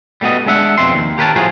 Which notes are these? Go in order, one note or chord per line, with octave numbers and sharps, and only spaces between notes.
G3 A3 B3 F#4 D#5
G#3 D4 E5 F#5
F2 B2 C4 C6
D#2
G4 A#4 B4 C#5 A5
A2 F3 F4 F#4 G#4